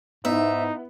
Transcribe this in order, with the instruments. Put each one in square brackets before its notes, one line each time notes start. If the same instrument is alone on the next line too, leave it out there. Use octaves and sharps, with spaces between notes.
[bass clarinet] G#2 [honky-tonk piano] B3 E4 [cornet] D#4 [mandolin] E5